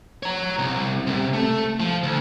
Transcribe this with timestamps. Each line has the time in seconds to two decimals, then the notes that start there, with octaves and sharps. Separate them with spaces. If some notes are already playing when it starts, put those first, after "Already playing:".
0.23 C#5 A#5
0.59 C2
1.07 C2 C3
1.34 A3
1.80 F3
2.03 D2